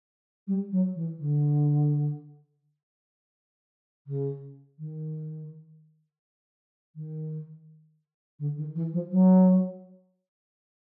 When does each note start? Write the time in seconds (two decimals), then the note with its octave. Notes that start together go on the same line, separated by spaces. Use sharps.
0.47 G3
0.72 F#3
0.96 E3
1.19 D3
4.07 C#3
4.79 D#3
6.95 D#3
8.39 D3
8.57 D#3
8.75 E3
8.93 F3
9.11 F#3